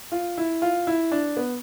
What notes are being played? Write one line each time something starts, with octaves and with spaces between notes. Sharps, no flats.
F4
E4
F4
E4
D4
B3